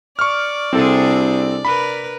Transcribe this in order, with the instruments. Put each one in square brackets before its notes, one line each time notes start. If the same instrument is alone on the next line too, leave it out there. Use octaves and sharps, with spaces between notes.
[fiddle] D5 [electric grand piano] C#6 F6
[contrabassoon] C2 [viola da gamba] C3 D4 G#4 [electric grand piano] C4 A4
[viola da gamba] A#4 B4 [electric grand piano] B5